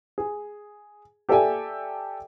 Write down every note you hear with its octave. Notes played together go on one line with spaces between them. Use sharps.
G#4
G4 A4 D5 E5 G5 G#5